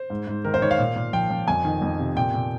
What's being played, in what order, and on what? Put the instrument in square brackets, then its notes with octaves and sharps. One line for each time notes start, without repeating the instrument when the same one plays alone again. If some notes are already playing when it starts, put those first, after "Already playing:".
Already playing: [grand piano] C5
G#2
G#2
D#3 A#4
C5
D#3 C#5
F5
A#2
A#2
F3 G5
F3
F2 G#5
D#3
F2
C3
A#2 G5
A#2